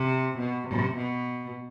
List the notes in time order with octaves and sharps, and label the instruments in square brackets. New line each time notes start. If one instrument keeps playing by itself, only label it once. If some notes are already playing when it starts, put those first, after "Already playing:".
Already playing: [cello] C3
B2
C3
B2